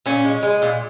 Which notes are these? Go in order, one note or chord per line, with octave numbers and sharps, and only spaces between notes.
A#2 C#4
G#3
G#3
A#2